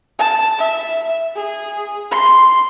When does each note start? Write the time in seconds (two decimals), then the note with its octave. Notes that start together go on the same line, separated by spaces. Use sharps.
0.19 A5
0.58 E5
1.36 G#4
2.12 C6